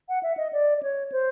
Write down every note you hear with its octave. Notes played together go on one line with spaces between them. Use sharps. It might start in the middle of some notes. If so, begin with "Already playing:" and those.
F#5
E5
D#5
D5
D5
C#5
C5